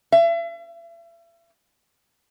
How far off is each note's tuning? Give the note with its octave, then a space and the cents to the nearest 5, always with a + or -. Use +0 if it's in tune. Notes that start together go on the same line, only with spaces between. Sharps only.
E5 +40